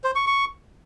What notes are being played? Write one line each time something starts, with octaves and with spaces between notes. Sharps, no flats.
C5
C#6
C#6